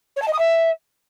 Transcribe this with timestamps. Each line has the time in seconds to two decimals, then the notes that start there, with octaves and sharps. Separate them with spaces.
0.16 C#5
0.22 A5
0.27 D#5
0.33 D#6
0.38 E5